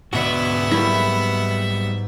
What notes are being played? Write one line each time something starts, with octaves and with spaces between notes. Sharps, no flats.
D2 G#2 B2 B3 F#4 D5 E5
F#3 G3 A#3 E4